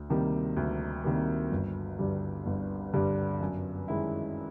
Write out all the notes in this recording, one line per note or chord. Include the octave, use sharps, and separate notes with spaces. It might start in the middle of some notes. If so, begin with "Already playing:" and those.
Already playing: D2
C3 D#3 G3 A#3
D2
C3 D#3 G3 A#3
G1
G2 D3 G3
G1
G2 D3 G3
F#2
D#3 G#3 C#4 E4